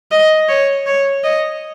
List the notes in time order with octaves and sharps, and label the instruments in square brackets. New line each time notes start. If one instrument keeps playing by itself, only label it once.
[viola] D#5
C#5
C#5
D#5